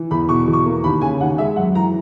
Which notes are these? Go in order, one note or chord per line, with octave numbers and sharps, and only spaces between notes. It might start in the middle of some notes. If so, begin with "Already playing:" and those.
Already playing: E3
E2 B5
B2 C#6
E2
C#6
A#3
D#2 B5
C#3 G#5
D#2 F#5
G#3 E5
F#2 F#5
E3 A#5